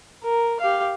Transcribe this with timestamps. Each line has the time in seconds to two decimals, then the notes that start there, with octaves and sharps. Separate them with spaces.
0.23 A#4
0.60 G4 F5